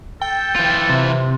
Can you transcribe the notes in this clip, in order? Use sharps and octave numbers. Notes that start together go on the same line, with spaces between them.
A4 G5
E3 F4
C3